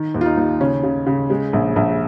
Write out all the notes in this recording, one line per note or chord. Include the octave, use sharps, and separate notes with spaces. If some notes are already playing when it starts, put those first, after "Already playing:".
Already playing: D#3
D#2
F4
D#4
D#2
C#3 C#4
C#3
C#3
G#3
A#1
A#1